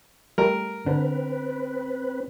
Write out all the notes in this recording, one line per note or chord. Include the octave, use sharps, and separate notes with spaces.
G3 A3 A#4
D3 C4 B4